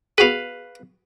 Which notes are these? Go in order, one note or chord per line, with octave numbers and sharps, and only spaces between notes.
B3 F#4 G#4 B4 F5